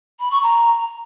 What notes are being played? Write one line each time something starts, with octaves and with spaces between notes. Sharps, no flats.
B5
C#6
A#5